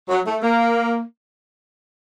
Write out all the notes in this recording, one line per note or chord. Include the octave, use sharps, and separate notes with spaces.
F#3
A3
A#3